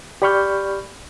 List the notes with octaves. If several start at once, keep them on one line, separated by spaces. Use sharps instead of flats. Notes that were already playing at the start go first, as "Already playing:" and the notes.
G4 D5 B5 C#6 F6 G6